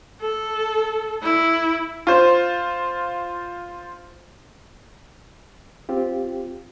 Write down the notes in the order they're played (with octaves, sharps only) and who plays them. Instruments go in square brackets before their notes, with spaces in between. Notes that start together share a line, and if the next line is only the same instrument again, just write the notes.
[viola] A4
E4
[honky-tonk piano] F4 C5
[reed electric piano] C4 F4 G4